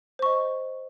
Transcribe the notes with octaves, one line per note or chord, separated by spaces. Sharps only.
C5 D#5 C#6